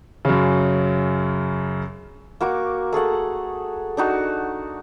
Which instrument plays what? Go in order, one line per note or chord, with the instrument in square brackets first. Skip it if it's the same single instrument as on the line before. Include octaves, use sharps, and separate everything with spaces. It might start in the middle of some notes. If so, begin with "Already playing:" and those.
[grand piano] F#2 C#3
[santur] A#3 F#4 C#6 D6
A3 G#4 A4 F#5
D4 D#4 F#4